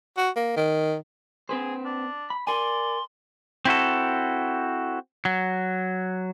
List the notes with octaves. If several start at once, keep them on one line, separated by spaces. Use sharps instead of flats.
F#4
A#3
D#3
C4 G#4 B4 C5
D4
B5
A#4 D5 G#5 C6
C4 E4 F#4 A4
F#3